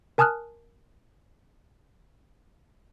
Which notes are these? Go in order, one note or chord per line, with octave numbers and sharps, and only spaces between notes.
A#4 G#5 A5 D#6 F6 F#6